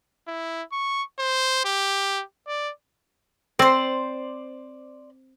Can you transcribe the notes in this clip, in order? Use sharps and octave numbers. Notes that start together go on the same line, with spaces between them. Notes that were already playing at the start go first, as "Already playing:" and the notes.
E4
C#6
C5
G4
D5
C4 C5 D5